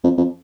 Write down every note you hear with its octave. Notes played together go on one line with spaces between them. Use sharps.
F2
F2